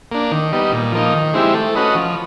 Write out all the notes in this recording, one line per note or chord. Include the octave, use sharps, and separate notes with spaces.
A#3 D4
D#3
G3 B3 D#4
A#2
F3 A#3 D#4
D#3
G#3 C4 E4 G4
A3
C#4 F#4 B4 D#5
F3